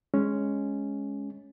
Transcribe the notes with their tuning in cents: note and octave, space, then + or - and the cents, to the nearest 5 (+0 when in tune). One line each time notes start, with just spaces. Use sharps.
G#3 +0 C#4 +0